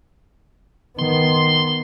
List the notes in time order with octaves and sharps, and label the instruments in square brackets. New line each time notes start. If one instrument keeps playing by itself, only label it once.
[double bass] D#3 B3 [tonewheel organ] C6